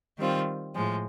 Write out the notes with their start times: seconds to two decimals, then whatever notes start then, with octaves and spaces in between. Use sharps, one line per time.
0.19 D#3 G3 C4 F4
0.75 A2 F3 G#3